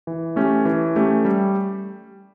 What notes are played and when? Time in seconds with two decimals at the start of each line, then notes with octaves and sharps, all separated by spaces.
0.07 E3
0.36 A3 C#4 G4
0.65 E3
0.96 A3 C#4 G4
1.25 G3